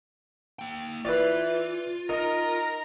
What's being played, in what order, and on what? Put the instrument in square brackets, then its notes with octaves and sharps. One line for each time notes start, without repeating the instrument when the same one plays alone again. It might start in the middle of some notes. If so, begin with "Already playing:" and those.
[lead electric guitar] A#3 G5
[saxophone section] E3 [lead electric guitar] F4 [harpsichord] B4 D5
[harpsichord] D#4 [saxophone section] A#4 [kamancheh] A#5